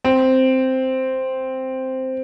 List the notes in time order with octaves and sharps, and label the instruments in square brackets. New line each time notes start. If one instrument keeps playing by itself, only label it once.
[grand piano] C4